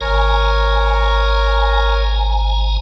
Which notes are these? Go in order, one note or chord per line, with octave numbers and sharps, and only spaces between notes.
G#1 A#4 C#5 G#5 A#5